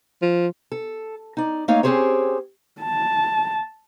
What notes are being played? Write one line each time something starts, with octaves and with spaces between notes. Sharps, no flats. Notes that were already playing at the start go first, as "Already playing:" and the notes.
F3
A4
D#4 D5
A3 A#3 D#4 C#5 F5
C4 C#4 G4 G#4 C5 C#5
A5